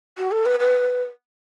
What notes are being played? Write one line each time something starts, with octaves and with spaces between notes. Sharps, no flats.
F#4
A4
B4
B4